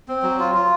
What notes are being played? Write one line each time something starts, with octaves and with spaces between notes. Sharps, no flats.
C4
F#3
F4
F4